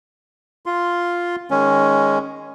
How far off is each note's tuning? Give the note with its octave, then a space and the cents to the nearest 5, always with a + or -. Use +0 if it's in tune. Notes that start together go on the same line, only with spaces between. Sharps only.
F4 +0 C6 +0
D#3 +0 G#3 -5 C#4 +5